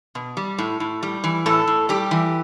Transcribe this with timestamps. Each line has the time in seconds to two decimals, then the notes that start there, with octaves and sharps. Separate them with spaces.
0.15 B2
0.37 G3
0.58 A2
0.80 A2
1.03 G3
1.24 E3
1.46 A2 A4
1.67 A2
1.89 G3 G4
2.11 E3